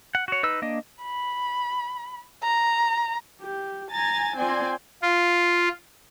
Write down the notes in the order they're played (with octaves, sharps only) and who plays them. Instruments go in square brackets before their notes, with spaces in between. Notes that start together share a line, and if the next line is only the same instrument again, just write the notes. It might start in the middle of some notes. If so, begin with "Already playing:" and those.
[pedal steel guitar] F#5
F#4 C#5
D#4 B4 E6
A#3 D4 D#5
[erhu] B5
A#5
[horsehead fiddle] G4
[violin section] G#5 A6 [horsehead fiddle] A#5
[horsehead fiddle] C4 F4 [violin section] D5 G#5 C6
[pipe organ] F4